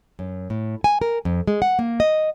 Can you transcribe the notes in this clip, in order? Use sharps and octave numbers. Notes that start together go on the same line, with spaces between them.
F#2
A2
G#5
A#4
F2
G#3
F#5
A#3
D#5